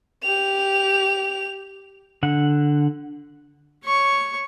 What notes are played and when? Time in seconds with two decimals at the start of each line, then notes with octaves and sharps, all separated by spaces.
0.23 G4 F7
2.23 D3 F#5
3.85 C#5 C#6